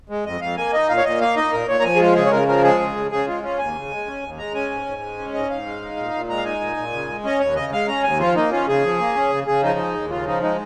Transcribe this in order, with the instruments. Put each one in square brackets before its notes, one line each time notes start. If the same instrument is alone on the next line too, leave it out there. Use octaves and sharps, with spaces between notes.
[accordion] G#3
F2 D#5
F2 F5
A#3 G#5
D#4 D#5
A#2 F5
C#5
A#2 D#5
A#3 F5
D#4 D#5
A#2 A#4
A#2 C#5
A#5
F3 G#5
G#4
G#3 F4
C#3 G#4
C#5
C#3 A#4
F3 A#4
G#3 G#4
C#3
C#3
C#3 G#4
G#3 F4
C#4 F4
D#2 G#5
C#3
G#3
C#4
D#2
G#3 A#5
C#4 G#5
G#2
G#2
G#3
C#4
G#2 D#5
G#2 F5
G#3
D#4
A#2
A#2
G#3 A#5
F5
D#4 G#5
A#2
A#2
C#3
G#3
C#4 D#5
D#2 C#5
C#3 D#5
G#3 F5
C#4 A#5
D#2 G#5
F3 F4
A#3 D#4
C#4 F4
C#3 G#4
F3
A#3
C#4
C#3
C#3 G#4
F3 D#4
G#3
D#2
C#3 F4
F3 D#4
G#3 D#4